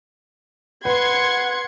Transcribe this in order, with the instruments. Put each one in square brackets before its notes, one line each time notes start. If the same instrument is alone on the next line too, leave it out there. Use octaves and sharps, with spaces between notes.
[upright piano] B4 [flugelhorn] F#5 [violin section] C6 G#6 C#7